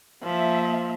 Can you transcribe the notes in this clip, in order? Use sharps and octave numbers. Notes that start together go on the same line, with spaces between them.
F3 A#3 E5